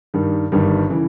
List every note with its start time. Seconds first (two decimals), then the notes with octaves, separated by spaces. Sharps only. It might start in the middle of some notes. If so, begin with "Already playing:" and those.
0.14 G2 D#3 G3
0.52 G1 G2 D#3 G3
0.89 C#3 E3